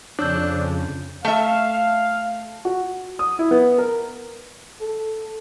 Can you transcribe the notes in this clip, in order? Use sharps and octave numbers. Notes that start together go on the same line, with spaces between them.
F2 C#3 D4 C#5 E6 G6
A3 E5 F5
F#4
D#6
E4
B3
A#4
A4